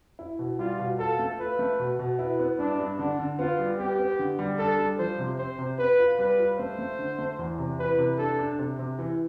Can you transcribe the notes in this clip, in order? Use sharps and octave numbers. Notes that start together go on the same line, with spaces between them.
E4
B2
G3 F4
B2
F4 A4
A3
F4 B4
A3
B2
B2
E4 B4
B3
G2 D4
G2
D3 D4
D3
B3 F4
G3
B3 G4
B3
D3
G3
D4 A4
G3
F3 C5
C3
C4 C5
C3
B3 B4
F4
G3 B4
F4
A3 C5
A3
D3
A3
E2
C3
E3 B4
C3
D4 A4
D4
C3
C3
E3